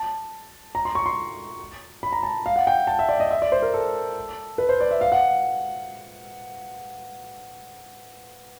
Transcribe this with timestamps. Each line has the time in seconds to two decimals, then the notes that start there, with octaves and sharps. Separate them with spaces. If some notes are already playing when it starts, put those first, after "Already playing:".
Already playing: A5
0.75 A#5
0.85 C6
0.95 C#6
1.06 C6
2.03 B5
2.12 A#5
2.23 A5
2.46 F5
2.56 F#5
2.67 G5
2.87 A5
2.99 E5
3.09 D5
3.20 D#5
3.31 E5
3.42 D5
3.52 C5
3.62 A#4
3.74 A4
4.58 B4
4.69 C5
4.80 D5
4.91 E5
5.01 F5
5.12 F#5